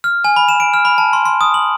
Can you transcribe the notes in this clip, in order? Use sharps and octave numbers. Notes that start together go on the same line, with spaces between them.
F6
G#5
B5
E7
D7
F6
B5
A5
C6
C6
D#6
F#7